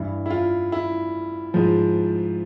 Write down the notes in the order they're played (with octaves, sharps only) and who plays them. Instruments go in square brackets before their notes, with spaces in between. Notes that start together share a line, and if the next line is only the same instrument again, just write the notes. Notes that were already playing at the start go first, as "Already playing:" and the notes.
Already playing: [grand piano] G2 E3 E4
E4
F4
E4
G#2 F3